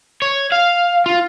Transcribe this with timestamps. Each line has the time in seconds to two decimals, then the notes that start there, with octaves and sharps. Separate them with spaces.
0.22 C#5
0.52 F5
1.06 F4